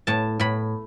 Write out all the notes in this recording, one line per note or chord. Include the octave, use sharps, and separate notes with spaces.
A2 A5
A2 B5